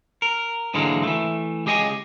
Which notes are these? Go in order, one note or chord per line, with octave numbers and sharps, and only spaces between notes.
A#4
G#2 D3 E3 F#3 G#3 A#3
E3 A3
C#2 G4 G#4 D#5 G5 G#5